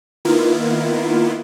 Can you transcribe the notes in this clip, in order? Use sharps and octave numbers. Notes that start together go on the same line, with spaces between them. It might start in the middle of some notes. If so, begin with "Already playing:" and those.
D#3 A#3 B3 E4 F4